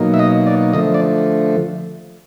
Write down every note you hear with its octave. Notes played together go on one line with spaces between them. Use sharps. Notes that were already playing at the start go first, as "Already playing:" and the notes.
Already playing: B2 F#3 A#3 D#4
E5
D#5
D5
D3 F3 A3 D#5
D5